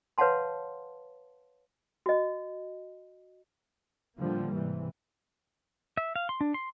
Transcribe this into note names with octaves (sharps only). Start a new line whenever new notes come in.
B4 C#5 F5 F#5 A5 C6
F#4 D#5
A2 D3 F3 G3 A#3
G#2 C3 E3
E5
F5
C6
D4
C6